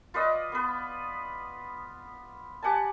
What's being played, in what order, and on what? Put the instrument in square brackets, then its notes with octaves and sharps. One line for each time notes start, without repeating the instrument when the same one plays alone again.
[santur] F4 B4 D5 D#5
B3 B4
G4 F#5 G#5 A5